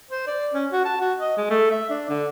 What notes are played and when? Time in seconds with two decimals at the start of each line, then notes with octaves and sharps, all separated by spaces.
0.11 C5
0.27 D5
0.54 C#4
0.71 F#4
0.85 A5
1.01 F#4
1.19 D#5
1.37 G#3
1.50 A3
1.71 E5
1.90 D4
2.10 D3